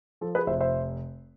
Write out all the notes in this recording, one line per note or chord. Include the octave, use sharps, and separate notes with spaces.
F3 A4
G#4 B4
F1 C5 E5
C5 E5